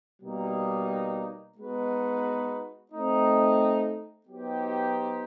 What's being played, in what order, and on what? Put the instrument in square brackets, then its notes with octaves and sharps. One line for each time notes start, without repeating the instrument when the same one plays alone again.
[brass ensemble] B2 G3 A#3 D#4
G#3 B3 D#4 F#4 B4
A3 C4 D#4
F#3 B3 D#4 G4 C5